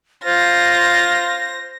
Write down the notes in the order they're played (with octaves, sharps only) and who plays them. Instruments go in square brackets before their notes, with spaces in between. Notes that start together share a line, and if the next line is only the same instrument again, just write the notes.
[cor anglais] F4 [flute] C5 [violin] A#6